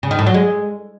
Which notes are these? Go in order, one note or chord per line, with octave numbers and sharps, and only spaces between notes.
C#3
D#3
A2
F#3
G#3